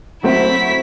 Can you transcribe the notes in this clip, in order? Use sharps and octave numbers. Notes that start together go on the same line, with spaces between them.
F#3 A3 C4 E4 B6